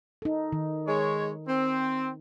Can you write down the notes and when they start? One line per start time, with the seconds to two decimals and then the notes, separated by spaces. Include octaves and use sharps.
0.22 D#4 A4
0.52 D#3
0.88 G#3 C#5
1.48 C4